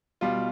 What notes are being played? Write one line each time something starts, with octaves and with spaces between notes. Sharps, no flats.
B2 G3 F4